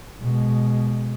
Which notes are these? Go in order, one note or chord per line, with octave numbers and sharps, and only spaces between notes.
B2 G#3